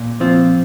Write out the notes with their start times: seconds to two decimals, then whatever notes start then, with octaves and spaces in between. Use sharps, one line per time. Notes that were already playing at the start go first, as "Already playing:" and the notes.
Already playing: A#2
0.20 F3 C4 F4